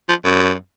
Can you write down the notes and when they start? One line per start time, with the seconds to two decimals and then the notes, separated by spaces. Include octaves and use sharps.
0.09 F3
0.24 F#2